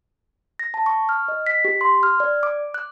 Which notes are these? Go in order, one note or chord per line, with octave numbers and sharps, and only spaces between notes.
A#6
A5
C#6
F6
D#5
B6
G4
C6
F6
D5
D6
F#6